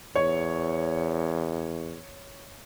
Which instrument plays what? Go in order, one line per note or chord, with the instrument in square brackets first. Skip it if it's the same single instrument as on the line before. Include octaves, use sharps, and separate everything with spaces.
[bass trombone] E2 [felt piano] C#5